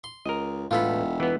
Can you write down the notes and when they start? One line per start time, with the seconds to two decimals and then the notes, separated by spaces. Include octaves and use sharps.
0.04 C6
0.26 C#2 A#4 D#5
0.71 E1 A2 B3 F4 A4 B5
1.20 E3 B3